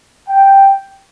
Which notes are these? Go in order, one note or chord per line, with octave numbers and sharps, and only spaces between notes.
G5